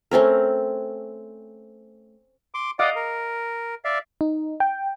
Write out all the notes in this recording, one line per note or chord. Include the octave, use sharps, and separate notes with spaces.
A3 C4 C#4 A#4
C6 D6
D5 D#5 F5 F#5 D6
A#4
D5 E5 F5
D#4
G5